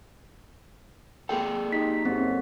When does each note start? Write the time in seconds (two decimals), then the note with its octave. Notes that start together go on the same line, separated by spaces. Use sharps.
1.29 A#3 G#4 A4 G5
1.72 D#4 G4 B6
2.05 F#2 C4